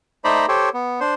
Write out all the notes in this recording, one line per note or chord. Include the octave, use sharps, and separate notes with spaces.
A3 D#4 C5 D5 A#5 B5
G4 A4 C5 C#5
B3
D4 C5